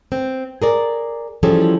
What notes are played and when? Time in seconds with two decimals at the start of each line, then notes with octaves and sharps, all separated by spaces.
0.12 C4
0.62 G#4 A#4 D5
1.43 E3 F3 G3 C#4 G#4 A4